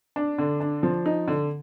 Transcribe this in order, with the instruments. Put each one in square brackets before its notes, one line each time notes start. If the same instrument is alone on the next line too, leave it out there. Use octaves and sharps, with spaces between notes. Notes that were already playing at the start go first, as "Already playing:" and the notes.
[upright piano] D4
D3
D4
F3
D#4
D3